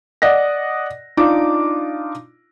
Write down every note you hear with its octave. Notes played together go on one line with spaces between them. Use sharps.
D5 D#5 F#5 A#6
D4 D#4 F4 D6